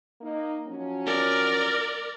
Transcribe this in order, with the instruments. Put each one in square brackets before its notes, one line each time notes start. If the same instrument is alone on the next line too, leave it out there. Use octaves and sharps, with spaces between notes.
[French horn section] A#3 D#4
F3 F#3 C#4
[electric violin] A#4 D5